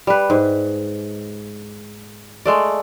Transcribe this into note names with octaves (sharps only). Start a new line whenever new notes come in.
G3 B4
G#2
G#3 A3 D5